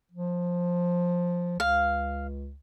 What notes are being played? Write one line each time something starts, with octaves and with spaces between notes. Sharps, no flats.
F3
C#2 F5